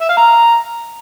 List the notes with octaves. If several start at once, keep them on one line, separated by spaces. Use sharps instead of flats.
E5
F5
A#5